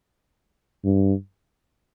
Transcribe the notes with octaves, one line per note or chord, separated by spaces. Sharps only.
G2